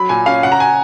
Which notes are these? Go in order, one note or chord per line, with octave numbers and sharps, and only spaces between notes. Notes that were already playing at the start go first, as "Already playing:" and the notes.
Already playing: F#3 B5
A#2 G#5
C#4 F5
C#3 F#5
A#5
G#5